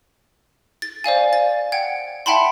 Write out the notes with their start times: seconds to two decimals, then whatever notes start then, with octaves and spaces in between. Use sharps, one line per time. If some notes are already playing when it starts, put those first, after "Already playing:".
0.82 A6
1.04 C5 D5 F5 G#5
1.33 A6
1.72 F#5 G5 G#6
2.26 E5 F#5 G5 A5 B5 C6